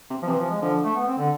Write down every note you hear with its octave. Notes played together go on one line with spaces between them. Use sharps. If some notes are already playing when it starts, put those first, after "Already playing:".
C3
F3
C3 E3
F3
G#3
D3 F3
A3
B3
C4
D3